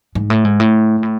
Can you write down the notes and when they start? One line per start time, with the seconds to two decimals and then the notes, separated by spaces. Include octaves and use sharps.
0.15 G#2
0.30 A2
0.45 G#2
0.60 A2
1.03 A2